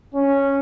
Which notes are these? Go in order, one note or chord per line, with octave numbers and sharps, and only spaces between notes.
C#4